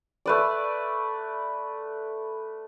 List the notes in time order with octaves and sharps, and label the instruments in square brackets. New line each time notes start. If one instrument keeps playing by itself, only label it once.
[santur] A3 B4 D5